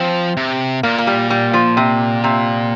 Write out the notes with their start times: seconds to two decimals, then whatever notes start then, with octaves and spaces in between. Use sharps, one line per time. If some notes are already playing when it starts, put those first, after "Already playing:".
Already playing: F3 C4
0.37 C3
0.83 A#2 A#3
0.98 A#3
1.07 G3
1.30 G3
1.54 F3
1.77 C3
2.24 C3